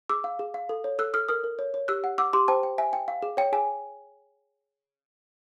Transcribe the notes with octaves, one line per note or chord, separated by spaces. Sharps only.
G#4 D6 E6
F5
G#4
F5
A4
C#5
A4 E6 F#6
A4 D#6 F6
A#4 D#6 F6
A#4
C#5
C#5
G4 E6 F#6
F#5
F#5 D6 E6
G4 C6 D6
C5 G5 A5
G5
E5 G#5
G5
F5
G#4
C#5 G5
G#4 G#5